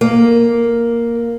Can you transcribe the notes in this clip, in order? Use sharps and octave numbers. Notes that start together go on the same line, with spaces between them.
A#3